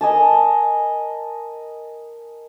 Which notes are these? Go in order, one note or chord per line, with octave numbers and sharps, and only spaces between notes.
A#4 D#5 G#5 A5